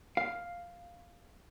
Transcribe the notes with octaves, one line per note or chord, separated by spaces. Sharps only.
F5